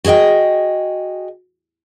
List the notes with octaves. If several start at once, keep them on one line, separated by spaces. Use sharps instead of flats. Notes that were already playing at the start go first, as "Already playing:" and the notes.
F#4 G#4 C5 D#5 G5